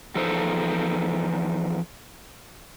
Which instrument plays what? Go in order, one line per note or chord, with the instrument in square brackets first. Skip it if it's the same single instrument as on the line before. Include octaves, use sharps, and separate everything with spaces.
[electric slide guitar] E2 F3 D#4 A4 C5